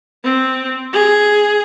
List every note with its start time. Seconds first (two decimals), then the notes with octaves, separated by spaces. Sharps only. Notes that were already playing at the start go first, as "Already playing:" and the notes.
0.24 C4
0.93 G#4